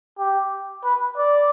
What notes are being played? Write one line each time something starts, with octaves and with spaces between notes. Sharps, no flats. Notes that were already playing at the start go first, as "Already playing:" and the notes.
G4
B4
D5